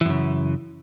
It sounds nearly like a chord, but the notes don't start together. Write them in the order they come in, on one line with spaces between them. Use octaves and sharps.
E3 F#2 C#3